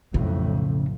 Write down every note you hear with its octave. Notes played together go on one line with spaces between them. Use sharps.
B1 F2 A2 C#3